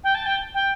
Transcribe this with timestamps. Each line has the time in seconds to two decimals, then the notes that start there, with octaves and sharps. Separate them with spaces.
0.04 G5
0.15 A5
0.26 G5
0.54 G5